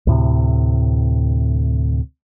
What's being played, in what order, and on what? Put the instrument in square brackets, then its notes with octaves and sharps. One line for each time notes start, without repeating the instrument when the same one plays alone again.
[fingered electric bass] D2 A2 C3